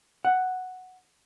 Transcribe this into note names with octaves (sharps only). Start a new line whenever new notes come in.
F#5